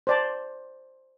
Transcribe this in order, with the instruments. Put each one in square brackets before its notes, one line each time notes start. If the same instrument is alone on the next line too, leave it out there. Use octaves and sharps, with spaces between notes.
[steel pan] C5 D5 A5